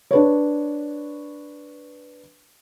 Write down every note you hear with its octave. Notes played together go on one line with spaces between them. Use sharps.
D4 B4 C#5